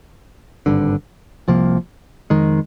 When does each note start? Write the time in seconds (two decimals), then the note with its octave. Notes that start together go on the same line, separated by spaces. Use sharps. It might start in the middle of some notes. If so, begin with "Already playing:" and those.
0.66 G#1 G2 D3
1.48 C2 C3 F3 A#3
2.30 F2 D#3 G#3